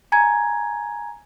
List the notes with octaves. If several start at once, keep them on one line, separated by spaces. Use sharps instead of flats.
G#5 A#5 G#6